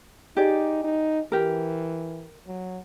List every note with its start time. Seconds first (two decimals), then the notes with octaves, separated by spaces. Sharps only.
0.37 D#4 G4 G#4 D5
0.84 D#4
1.32 E3 G4 A#4
2.47 F#3